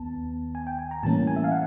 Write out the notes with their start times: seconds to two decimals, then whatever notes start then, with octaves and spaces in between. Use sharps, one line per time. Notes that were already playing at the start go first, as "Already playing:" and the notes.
Already playing: D#2 B3 A5
0.55 G#5
0.67 G5
0.79 G#5
0.91 A#5
1.03 A2 E3 G3 A#3 C#4 A5
1.27 G#5
1.36 E5
1.44 F5
1.51 F#5